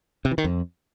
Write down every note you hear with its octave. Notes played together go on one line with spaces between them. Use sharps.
C3
E3
D#3
F2